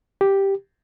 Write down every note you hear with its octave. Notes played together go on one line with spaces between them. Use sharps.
G4